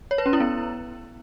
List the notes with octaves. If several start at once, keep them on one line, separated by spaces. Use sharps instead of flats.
C#5
B4
C#4
E4
B3